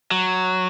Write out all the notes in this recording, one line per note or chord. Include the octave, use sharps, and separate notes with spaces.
F#3